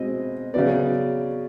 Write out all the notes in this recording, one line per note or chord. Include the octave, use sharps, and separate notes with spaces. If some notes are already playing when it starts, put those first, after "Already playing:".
Already playing: B2 G#3 C4 D#5
C#3 F#3 B3 D5